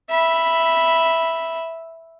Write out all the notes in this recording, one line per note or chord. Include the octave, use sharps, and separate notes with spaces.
E5 B5